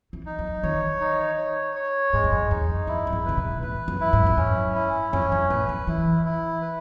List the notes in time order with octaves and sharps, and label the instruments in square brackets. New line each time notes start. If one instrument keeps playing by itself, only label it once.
[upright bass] E3
[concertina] D#4
[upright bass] F#3
[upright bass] D#3 [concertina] C#5
[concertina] D#4
C#5
C#5
[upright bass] G#2 [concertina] G#3
[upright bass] E2
F#2
[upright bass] E2 [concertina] D#4
[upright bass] F#2 [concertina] E4
[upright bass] F#2
G#2
[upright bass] C#3 [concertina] B4
[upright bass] B2
[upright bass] A2 [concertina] B4
[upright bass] F#2
[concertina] E4
[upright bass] G#2
E2
[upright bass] F#2 [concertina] C#4
[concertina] E4
[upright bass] F#2 [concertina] C#4
[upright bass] G#2
[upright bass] A2 [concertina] B4
[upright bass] F#3
[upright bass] E3 [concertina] E4
[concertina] E4
B4